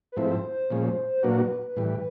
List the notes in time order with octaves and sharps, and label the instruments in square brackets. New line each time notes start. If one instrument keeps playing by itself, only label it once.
[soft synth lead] B4
[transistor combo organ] G#2 F3 A3 C4 E4 [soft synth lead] C5
[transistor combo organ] A#2 F3 G#3 C#4
[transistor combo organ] A#2 F#3 A#3 D4 F#4 [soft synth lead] B4
[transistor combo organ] A2 E3 G3